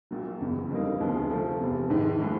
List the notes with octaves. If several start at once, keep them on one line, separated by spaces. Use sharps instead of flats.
A#1 A#2 F#3
F#1 E2 C#3
F2 D3 G3 A#3 D#4
D2 C#3 F3 G#3 B3
C3 F3 A3 C4
F1 E2 C3
A#1 G#2 D#3
A2 F3 G#3